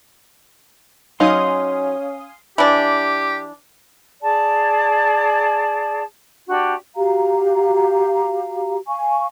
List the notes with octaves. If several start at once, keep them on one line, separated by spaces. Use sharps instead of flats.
F#3 C#4 D#4 F5 G#5 C6 D#6
E3 D4 G4
G#4 D5 A5
D4 F#4 G4
F#4 G4 F5 A#5
F5 G#5 C#6